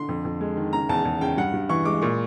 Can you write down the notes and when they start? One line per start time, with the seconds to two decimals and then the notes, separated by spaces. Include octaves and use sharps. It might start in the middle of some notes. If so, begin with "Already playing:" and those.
Already playing: D3 C6
0.09 F2
0.25 F2
0.41 G#3
0.57 D#3
0.73 C#3 A#5
0.89 E2 A5
1.05 E2
1.21 C#3 G5
1.37 G2 F#5
1.53 G2
1.69 E3 C#6
1.85 G#3 D6
2.02 A#2 C#6